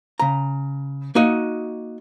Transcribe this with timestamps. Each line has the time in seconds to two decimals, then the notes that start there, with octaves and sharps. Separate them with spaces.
0.20 C#3 A#5
1.15 A#3 D#4 F#4 D#5